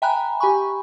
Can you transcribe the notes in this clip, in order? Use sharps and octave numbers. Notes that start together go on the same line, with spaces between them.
E5 G5 G#5 A#5 B5 F#6
G4 G#5 B5 C#6